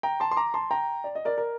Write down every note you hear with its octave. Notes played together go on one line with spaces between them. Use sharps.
G5 A#5
A5 C6
C6
A#5 D6
A5 C6
G5 A#5
D5
D#5
A#4 D5
A#4